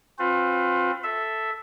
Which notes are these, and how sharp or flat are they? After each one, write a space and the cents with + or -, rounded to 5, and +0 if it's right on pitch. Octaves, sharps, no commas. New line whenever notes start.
C4 +35 F4 +35 B4 +45
A4 +0 E5 +0